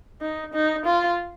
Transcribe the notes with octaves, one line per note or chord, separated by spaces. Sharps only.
D#4
D#4
F4